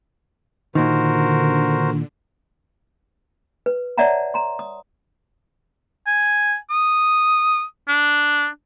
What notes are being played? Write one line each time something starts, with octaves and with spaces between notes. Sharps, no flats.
A#2 D3 D#3 F#4 A#4 C5
B4
C#5 D5 E5 F#5 A5 A#5
A#5 C6
D#6
G#5
D#6
D4